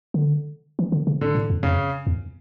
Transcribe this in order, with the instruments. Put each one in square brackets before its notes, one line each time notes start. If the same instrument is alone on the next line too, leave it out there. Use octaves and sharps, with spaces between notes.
[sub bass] D3
E3
D3
C#3
[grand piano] D3
[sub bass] A2
F2
[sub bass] F2 [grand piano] C#3
[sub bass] E2